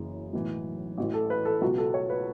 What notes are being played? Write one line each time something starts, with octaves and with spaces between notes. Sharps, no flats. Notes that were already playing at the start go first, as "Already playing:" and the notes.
Already playing: F#1 F#2 C#3 E3
B1 A2 E3
A1 A2 E3 F#4
A4
B4
A4
C#2 B2 F#3 F#4
A4
C#5
B4